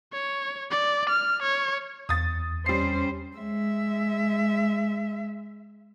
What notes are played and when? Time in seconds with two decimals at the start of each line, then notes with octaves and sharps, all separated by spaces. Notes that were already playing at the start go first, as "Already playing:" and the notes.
0.13 C#5
0.71 D5
1.09 F6
1.43 C#5
2.09 E2 D#6 A6
2.66 G3 C#4 C5 C7
3.37 G#3 E5